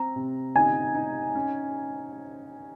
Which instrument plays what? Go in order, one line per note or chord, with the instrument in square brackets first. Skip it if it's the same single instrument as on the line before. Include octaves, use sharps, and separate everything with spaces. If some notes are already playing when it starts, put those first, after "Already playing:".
Already playing: [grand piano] C4 [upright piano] A#5
[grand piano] C3
[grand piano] D#4 [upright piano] G#5
[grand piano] D#4
C#4